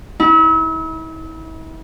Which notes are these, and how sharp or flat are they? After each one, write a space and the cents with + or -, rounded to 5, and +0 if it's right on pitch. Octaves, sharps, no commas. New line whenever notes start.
E4 -40